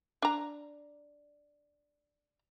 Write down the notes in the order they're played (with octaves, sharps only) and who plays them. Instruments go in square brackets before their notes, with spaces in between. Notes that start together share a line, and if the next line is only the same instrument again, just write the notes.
[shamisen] D4 A#5